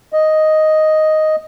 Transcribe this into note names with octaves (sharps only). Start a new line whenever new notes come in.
D#5